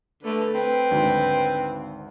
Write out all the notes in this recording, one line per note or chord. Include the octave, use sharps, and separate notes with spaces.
D3 A3 B4
C4 B4
G#1 D2